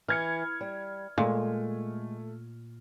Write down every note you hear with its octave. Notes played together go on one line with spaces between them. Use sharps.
E3 F6 G#6 C#7
G3
A#2 G#3 A3